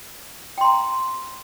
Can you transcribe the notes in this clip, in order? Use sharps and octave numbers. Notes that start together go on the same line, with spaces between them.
G5 A#5 C6